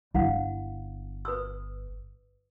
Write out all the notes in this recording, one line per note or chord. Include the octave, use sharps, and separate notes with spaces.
G1 E4 F5 F#5
B4 D#6 E6